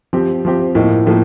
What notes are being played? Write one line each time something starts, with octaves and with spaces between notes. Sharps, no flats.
F3 C4 G4
F3 C4 G4
A2 F3 A#3 D#4
A2 F3 A#3